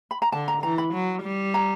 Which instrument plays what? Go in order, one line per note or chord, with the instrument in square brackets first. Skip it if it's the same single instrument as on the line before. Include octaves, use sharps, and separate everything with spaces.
[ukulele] B5
A#5
[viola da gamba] D3 [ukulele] A5
[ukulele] A#5
[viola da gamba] E3 [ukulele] A#5
[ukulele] B5
[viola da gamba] F#3
G3
[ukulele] A#5